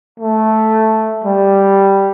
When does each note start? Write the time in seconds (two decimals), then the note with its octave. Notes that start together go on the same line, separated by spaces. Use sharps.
0.20 A3
1.24 G3